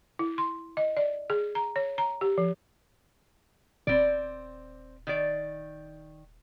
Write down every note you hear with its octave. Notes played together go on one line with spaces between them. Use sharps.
E4
C6
D#5
D5
G#4
A#5
C#5
A#5
G4
F3
D#1 C4 D5
D#3 D5